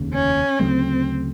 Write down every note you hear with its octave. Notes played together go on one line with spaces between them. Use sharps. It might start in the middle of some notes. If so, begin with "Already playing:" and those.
Already playing: F1 D#2 C#3
C#4
D2 C#3 F#3 A3 C4